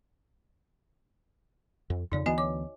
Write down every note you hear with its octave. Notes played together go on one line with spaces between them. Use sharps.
F2
F2 C#3 D#4 D5
D2 E3 B3 F#4 D#5 G#5
C#5 D6